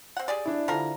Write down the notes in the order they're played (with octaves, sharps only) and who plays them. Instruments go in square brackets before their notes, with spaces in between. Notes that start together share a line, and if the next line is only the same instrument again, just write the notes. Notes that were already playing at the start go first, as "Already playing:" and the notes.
[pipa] C4 F#5
G4 G#4 D5
[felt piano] D4 E4
[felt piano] D3 E4 [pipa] F3 G3 A#4